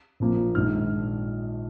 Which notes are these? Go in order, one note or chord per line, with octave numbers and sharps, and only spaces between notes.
A#1 A#2 F3 A#3
A#1 G#2 D#3 F6